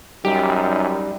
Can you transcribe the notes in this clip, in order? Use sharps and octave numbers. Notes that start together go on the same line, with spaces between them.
F#2 G3 D#4 G4